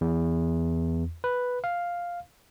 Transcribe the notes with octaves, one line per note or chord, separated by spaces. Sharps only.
E2
B4
F5